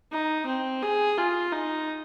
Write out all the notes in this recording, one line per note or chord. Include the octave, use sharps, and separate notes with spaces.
D#4
C4
G#4
F4
D#4